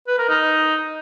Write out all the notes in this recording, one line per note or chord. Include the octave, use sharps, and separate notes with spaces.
B4
A#4
D#4